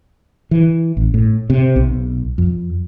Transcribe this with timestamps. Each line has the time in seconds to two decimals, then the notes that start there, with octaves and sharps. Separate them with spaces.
0.51 E3
0.97 A1
1.14 A2
1.50 C3
1.76 B1
2.38 F2